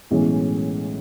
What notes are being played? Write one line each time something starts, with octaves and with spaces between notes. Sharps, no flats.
B1 A2 E3 G#3 C#4